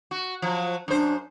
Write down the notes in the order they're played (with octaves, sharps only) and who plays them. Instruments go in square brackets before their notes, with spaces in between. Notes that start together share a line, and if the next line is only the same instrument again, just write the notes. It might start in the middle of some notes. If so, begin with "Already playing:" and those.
[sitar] F#4
F3 F#3
[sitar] F#2 C5 [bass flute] D4